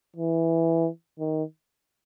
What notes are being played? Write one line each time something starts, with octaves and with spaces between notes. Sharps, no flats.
E3
D#3